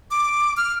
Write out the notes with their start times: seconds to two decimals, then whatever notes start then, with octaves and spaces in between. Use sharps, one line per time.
0.11 D6
0.57 F6